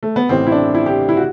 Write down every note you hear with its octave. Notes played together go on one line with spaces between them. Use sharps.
A3
B3
A1 A2 E3 C4
E4
D4
E4
G4
E4
F#4